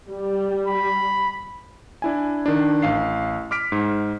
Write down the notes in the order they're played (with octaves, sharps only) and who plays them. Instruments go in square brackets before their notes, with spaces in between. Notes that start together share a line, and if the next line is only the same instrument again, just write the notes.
[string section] G3
[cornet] B5
[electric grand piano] D4 E4 G#5
D#3 D4
A1 F5 C7
D6 F6 B6 D7
G#2